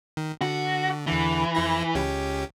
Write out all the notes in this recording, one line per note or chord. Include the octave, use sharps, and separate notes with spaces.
D#3
D3 F#4
E2 D3 E3
F2 E4 A#6
C#2 C#4 G4